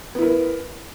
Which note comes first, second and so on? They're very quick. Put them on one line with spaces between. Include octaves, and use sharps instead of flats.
B3 E4 A#4